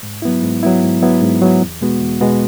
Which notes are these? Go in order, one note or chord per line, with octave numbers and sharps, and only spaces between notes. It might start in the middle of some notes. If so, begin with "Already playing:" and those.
G#2
F#3 B3 E4
G#2
F#3 B3 E4
G#2
F#3 B3 E4
G#2
F#3 B3 E4
E2
B2 G#3 B3 F#4
E2
B2 G#3 B3 F#4